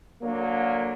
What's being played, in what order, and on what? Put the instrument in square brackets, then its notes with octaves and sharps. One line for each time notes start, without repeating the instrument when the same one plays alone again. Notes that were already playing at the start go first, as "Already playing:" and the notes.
[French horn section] D3 F#3 A#3